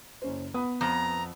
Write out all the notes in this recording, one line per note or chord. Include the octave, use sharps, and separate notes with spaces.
F#1 C#4 C5
B3 F#5 B5 D#6
F2 A#5